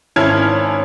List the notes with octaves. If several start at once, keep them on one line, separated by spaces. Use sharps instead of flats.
G#1 C#4 E4 A5 F6 G#6